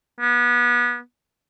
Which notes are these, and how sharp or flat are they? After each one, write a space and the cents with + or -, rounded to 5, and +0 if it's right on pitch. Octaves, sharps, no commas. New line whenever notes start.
B3 -30